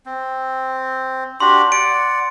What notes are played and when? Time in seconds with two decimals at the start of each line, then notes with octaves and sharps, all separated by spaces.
0.06 C4
1.40 D4 F#4 G4 C6
1.72 D5 F#5 D7